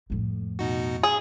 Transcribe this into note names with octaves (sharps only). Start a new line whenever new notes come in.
F2 A2
B2 D#4 F#4
G#4